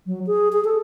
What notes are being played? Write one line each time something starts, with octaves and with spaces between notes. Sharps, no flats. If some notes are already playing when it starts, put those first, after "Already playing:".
F#3
G#4
G#4
A4